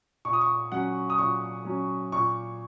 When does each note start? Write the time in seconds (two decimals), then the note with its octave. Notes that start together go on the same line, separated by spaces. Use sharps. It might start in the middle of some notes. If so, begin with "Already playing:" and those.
0.25 A#2 C#6
0.33 D#6
0.41 C#6
0.72 F#3 C#4 F#5
1.10 D#6
1.18 A#2 C#6
1.65 F#3 C#4
2.12 A#2 C#6